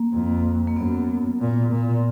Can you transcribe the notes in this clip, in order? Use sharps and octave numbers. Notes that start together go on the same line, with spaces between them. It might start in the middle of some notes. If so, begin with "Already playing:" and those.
Already playing: A#3
F2
A#3
F#2 B3
A#2
A#2